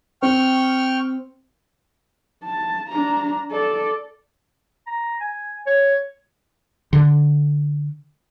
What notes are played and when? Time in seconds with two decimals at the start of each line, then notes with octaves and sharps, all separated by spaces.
0.22 C4 G5 C#6 F6
2.44 A5
2.89 D4 A#5
3.51 A4 D5
4.87 A#5
5.21 G#5
5.67 C#5
6.93 D3